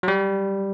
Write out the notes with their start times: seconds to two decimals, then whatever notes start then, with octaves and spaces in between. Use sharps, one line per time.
0.03 F#3
0.08 G3